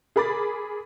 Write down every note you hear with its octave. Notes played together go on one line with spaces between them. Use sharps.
G#4 A#4 B5 D6 A6